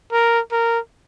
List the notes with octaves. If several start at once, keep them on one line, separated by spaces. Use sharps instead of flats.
A#4
A#4